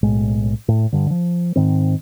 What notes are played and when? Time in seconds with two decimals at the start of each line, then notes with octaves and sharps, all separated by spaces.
0.03 B1 A2 G#3
0.68 A2
0.92 G2 D3
1.11 F3
1.56 G#2 D#3 C4